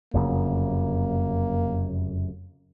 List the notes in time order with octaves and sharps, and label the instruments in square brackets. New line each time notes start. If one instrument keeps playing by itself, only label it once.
[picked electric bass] F1 F#2 C#3 [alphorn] A#3